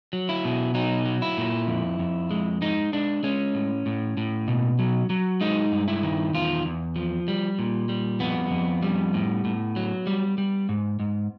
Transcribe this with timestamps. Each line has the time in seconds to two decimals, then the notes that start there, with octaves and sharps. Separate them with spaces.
0.13 F#3
0.29 E4
0.45 B2
0.75 F#3 D#4
1.05 F#3
1.22 E4
1.38 A#2
1.68 F2
1.99 F2
2.31 G#3
2.62 G#3 D#4
2.93 G#3 D4
3.23 G#3 C#4
3.54 A2
3.86 A2
4.17 A2
4.48 B2
4.79 F#3
5.10 F#3
5.41 G#3 D#4
5.72 G2
5.88 E4
6.03 D#3
6.34 E2 F4
6.65 E2
6.96 F3
7.28 G3
7.59 A#2
7.89 G3
8.20 F2 B3
8.51 F2
8.83 G3
9.14 A2
9.45 A2
9.76 F#3
10.07 G3
10.38 G3
10.69 G#2
11.00 G#2